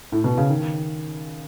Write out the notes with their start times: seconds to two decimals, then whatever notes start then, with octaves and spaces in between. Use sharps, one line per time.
0.12 A2
0.24 B2
0.38 C#3
0.50 D#3